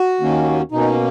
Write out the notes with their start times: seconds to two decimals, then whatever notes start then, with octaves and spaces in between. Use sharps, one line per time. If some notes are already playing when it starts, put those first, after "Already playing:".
Already playing: F#4
0.20 D#2 D#3 A#3 C#4
0.72 B2 A#3 C#4 D#4